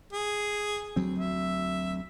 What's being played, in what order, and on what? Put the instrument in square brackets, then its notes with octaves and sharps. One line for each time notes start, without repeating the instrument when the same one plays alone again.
[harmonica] G#4
[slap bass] D2 F#3 C4
[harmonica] E5